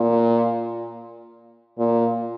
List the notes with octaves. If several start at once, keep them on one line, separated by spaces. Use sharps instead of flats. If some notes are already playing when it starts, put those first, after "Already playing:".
Already playing: A#2
A#2